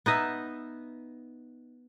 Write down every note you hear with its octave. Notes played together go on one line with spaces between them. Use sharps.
B3 D#4 D#5 E5